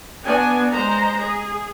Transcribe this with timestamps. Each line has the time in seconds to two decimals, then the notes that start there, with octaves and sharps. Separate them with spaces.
0.23 B3 D4 F#4 G#5
0.70 G#3 C5 A#5
1.20 G#4